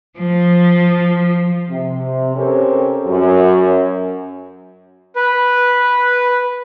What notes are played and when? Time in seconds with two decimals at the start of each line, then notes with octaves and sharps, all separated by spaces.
0.18 F3
1.70 C3
2.35 C4 C#4 G4 A4 A#4 C#5
3.05 F#2
5.15 B4